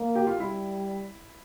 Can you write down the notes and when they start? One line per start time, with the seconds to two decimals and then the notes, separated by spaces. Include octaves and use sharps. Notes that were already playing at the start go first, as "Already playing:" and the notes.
Already playing: A#3
0.15 G4
0.27 F4
0.39 G3 E4